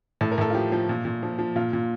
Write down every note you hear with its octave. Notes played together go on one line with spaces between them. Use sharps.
A2 A4
A#4
A2 A4
F4
F3 G4
F3
A#2
A#2
F3
F3
A#2 F4
A#2